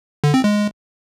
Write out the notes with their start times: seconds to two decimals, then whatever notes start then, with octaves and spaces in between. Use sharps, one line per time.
0.24 D3
0.34 C4
0.44 G#3